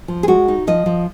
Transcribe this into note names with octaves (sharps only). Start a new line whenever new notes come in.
F3
G#4
G#3 F#4
D#4
F3 D#5
F3